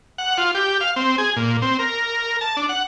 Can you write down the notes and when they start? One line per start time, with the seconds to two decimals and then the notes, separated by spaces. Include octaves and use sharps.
0.18 F#5
0.38 F4
0.55 G4
0.81 F5
0.96 C4
1.18 G#4
1.36 A#2
1.62 C4
1.79 A#4
2.41 A5
2.57 D4
2.69 F#5